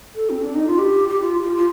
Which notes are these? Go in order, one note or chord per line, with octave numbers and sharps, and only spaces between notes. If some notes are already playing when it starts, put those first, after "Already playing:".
A4
C4
D4
D#4
F4
G4
G4
F4
F4
F4